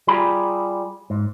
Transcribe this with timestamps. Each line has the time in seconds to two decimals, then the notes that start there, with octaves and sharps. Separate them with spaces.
0.07 G3 F4 G4 G#4 A#5 B5
1.10 G#2